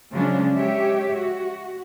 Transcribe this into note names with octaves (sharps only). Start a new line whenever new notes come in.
C#3 F3 F#3 G#3 C#4 D4
G#3 G4 C#5 E5
F#4